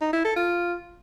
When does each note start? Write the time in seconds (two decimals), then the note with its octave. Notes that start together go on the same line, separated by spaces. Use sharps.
0.01 D#4
0.13 E4
0.24 A4
0.36 F4